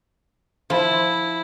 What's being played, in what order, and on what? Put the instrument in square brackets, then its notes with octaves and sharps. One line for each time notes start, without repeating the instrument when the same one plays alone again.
[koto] F3 [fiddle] E4